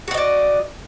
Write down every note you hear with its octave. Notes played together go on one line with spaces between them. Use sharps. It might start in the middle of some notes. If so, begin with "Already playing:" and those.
F#4 D5 D#5 F#5